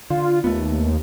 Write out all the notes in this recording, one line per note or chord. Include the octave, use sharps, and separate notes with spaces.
D3 F4
D#2 A3 B3